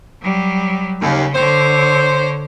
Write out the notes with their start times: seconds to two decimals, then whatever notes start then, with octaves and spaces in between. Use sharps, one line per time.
0.22 F#3 G3
1.02 D#2 C#3
1.35 D3 C5 C#5